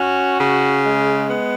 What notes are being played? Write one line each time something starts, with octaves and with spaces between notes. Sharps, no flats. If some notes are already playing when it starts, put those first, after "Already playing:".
Already playing: C#4 F#4
C#3
G#3
B3